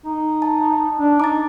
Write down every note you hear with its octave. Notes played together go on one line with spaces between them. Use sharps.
D#4
A5
D4
D#4 D6 A6